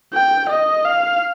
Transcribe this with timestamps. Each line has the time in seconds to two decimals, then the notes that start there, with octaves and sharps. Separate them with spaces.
0.13 G5
0.50 D#5
0.85 F5